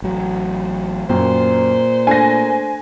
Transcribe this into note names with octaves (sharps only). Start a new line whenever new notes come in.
A1 F#3
F#2 A#2 C5 G5
A3 D4 G#5 A#6